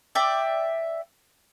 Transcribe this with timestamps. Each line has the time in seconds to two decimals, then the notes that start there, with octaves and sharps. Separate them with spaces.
0.15 D5 E5 G5